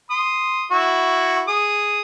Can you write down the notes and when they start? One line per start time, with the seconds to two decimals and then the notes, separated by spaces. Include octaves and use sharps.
0.10 C6 D#6
0.71 E4 F#4 C#6
1.48 G#4 D#6